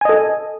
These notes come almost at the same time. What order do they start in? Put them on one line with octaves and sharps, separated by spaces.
G#5 D#5 A4